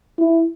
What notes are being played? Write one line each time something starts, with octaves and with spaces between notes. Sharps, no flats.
E4